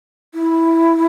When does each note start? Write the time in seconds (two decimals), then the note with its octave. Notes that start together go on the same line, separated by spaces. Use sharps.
0.34 E4